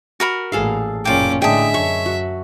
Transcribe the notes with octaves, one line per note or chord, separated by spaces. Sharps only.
F#4 A#4 B5
A1 A#2 G#4 A4 F5
F#1 A#2 C#4 F4 G5 D6
A2 D3 G#3 D4 E5 G5 D#6
F#2 C#5 C#6
F#4